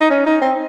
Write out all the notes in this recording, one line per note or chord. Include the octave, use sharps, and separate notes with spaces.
D#4
C#4
D#4
C4